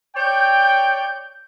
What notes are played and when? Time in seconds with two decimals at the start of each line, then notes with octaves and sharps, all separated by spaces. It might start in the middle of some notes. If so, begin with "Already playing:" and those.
0.16 C#5 D5 G5 G6